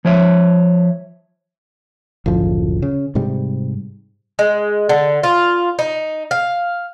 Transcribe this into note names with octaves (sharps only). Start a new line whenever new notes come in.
F3 C#5 E5
F#1 D2 A2 F3
C#3
G#2 C3 G3
G#3
D3
F4
D#4
F5